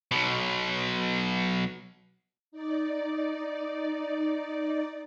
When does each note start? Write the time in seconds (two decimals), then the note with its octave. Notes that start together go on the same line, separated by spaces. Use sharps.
0.11 B1 B2
2.52 D#4 D5